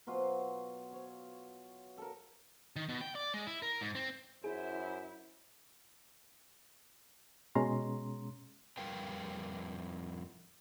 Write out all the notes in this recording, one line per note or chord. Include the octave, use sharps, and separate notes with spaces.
B2 F#3 F4 C5
C#5
A4 A#4
D#3
B2
G5
D5
G#3
E4
A#4
G#2
C4
F#2 E4 G#4 C5
B2 G#3 C#4 A#5 C6
F2 G3 A#4 B4 F5 G5